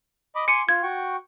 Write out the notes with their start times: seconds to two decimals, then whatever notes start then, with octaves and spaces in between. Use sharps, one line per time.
0.35 D#5 B5 D6
0.48 G#5 C6 D6 C#7 D#7
0.69 F4 G#6
0.83 F#4 G5 C#6